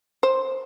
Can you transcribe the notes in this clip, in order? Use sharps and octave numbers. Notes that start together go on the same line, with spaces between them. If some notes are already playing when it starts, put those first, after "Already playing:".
C5